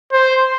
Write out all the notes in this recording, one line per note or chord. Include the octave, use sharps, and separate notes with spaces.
C5